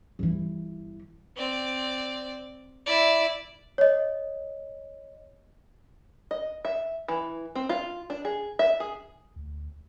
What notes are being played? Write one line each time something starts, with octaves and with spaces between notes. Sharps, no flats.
G1 E3
C4 D5
E4 D5
C#5 D#5
D#5
E5
E3
C4
F4
D4
G#4
E5
G#4
D2